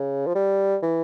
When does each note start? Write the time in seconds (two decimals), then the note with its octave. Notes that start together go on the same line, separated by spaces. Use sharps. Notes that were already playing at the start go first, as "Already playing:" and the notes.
Already playing: C#3
0.27 F3
0.35 G3
0.83 E3